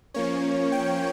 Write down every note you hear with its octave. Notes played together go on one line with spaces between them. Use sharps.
F3 A#3 C#4 C#5
G5